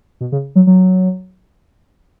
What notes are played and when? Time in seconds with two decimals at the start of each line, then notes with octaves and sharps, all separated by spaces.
0.21 B2
0.32 C#3
0.55 F#3
0.67 F#3